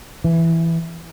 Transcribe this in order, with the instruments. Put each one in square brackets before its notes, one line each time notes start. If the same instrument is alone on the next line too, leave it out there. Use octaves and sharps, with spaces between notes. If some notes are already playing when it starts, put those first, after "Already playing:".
[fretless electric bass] E3